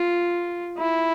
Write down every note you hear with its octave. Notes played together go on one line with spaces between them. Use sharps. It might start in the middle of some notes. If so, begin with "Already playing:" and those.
Already playing: F4
E4